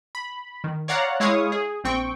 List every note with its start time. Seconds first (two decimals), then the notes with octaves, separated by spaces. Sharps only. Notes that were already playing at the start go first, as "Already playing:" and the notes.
0.15 B5
0.64 D#3
0.88 C#5 D5 F5 F#5 A#5 F#6
1.20 G#3 E4 C#5 F5 C#6 D#6
1.52 G#4
1.84 A#1 C4 G5 C#6